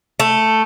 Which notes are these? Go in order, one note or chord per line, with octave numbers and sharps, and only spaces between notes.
A3